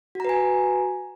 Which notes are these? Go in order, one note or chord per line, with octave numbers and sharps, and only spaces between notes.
F#4 B4 G#5 A#5